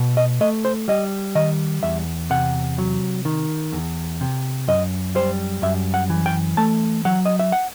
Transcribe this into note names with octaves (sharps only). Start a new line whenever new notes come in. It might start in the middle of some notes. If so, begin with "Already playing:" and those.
Already playing: B2
D#5
A3 D#5
C5
G3 D#5
D#3 D#5
E2 E5
C3 F#5
F#3
D#3
E2
C3
F#2 D#5
G3 C5
F#2 E5
F#5
E3
G5
A3 A5
F#3 F#5
D#5
E5
F#5